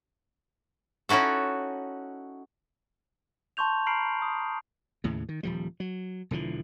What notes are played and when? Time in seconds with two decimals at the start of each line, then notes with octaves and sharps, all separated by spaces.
1.09 C#4 D#4 E4 F#4 A4
3.57 A5 C6 C#6 G6 F7
3.87 A#5 B5 F6 C7 D7 F#7
4.22 D#6
5.04 D#2 A2 C#3
5.29 D#3
5.43 D#1 F3 G3
5.80 F#3
6.31 E1 D3 E3 F3